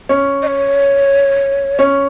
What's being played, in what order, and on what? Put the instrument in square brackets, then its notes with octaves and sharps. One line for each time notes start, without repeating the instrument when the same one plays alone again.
[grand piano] C#4
[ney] D#5
C#5
[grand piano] C#4